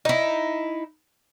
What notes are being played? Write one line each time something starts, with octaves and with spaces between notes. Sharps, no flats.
D#4 E4